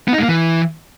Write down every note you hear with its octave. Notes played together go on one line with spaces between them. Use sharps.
B3
D#4
G#3
A#3
E3